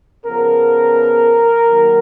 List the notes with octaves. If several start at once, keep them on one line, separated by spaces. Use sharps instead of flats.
C#3 F3 B3 A#4
G#2 D#3 F#3 A#3